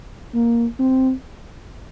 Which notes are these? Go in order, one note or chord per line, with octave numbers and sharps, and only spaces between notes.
A#3
C4